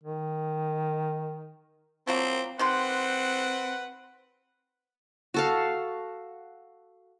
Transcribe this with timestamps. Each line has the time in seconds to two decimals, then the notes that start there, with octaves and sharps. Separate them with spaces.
0.04 D#3
2.07 F3 F#3 A#3 C4
2.59 D#3 C4 G4 B4 F#5 C6
5.34 F#4 A4 F5